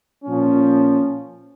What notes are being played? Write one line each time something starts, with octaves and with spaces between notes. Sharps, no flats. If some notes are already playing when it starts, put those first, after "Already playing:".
A#2 F3 C#4